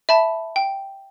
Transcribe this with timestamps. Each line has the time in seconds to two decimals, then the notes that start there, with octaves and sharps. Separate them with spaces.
0.09 E5 A5 B5
0.56 G5